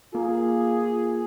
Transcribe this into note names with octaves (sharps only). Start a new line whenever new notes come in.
A#3 F4 G#4